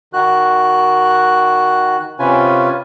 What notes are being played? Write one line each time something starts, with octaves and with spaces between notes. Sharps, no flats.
D#3 F#4 F#6
C3 C#4 F4 B4 G#5